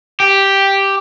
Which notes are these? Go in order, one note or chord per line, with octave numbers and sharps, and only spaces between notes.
G4